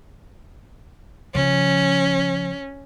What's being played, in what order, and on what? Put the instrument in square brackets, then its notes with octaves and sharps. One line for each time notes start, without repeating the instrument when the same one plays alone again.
[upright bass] C#3 F3 [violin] C#4